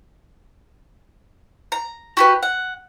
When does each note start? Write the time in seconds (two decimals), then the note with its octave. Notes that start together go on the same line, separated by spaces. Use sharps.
1.72 A#5
2.17 F#4 G4 B4
2.43 F#5